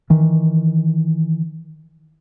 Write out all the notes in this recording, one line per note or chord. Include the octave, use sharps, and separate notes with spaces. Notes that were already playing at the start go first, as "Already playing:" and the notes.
D#3 E3